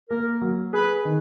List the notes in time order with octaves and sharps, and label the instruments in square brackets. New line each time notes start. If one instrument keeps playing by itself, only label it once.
[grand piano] A#3 [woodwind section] A#4
[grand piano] F#3
[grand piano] G#4 [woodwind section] B4
[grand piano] D#3